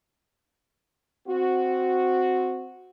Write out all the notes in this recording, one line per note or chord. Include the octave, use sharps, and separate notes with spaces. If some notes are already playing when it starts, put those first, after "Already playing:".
C4 F#4